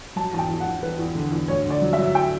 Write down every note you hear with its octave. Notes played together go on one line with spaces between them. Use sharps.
F#3 A5
E2 A5
G5
E2
F#5
E2
E2 B4
E2
D3
E2
D2 C#5
D3
D5
F#3
E5
F#3
G5